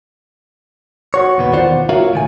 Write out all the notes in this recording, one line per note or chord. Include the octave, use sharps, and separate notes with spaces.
F#4 C#5
D#2 B2 B3
E2 D#3 F4 C5 D5 F#5
F4 F#4 A#4 C#5 E5 F5
A2 D#3 G#5